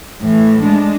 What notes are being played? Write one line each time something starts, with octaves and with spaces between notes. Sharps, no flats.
A2 E3
G#3 D4